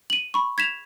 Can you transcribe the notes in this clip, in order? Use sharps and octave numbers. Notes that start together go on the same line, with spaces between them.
D#7 F#7
B5 C#6
G#6 B6 E7 F7